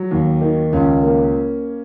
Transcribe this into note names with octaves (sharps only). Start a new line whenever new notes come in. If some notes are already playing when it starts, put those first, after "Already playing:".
Already playing: F#3
D#2
D#3
C#2 C#4
A#3